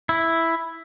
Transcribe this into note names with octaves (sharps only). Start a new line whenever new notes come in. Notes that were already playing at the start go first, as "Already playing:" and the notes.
E4